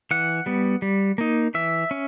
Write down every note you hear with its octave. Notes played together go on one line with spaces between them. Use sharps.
E3 F#5
G3 B3
G3
A#3 D#4
E3 E5
C#4